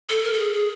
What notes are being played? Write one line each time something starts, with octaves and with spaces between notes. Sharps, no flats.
A4
A#4
A4
G#4
G#4